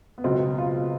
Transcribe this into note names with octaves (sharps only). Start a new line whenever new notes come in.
B3
C#2 B2 F#3 C4
F4